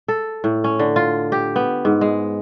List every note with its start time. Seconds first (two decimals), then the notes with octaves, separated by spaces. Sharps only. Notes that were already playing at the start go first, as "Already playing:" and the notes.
0.08 A4
0.44 A2
0.64 C#4
0.79 D3
0.96 F4
1.32 G4
1.56 B3
1.85 G#2
2.01 G#3